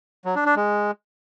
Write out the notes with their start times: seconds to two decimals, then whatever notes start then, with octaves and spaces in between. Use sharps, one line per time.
0.25 F#3
0.35 D4
0.46 D4
0.56 G#3